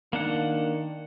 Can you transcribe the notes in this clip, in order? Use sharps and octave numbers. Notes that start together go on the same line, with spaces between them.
D#3 A#3 D4 F#5